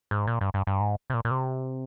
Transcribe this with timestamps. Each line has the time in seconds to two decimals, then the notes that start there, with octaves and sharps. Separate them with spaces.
0.11 G#2
0.27 A#2
0.41 G2
0.54 G2
0.67 G2
0.80 G#2
1.10 C3
1.14 A#2
1.25 A#2
1.31 C3